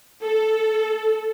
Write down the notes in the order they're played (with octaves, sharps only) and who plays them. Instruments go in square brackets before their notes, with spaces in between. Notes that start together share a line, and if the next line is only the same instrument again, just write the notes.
[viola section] A4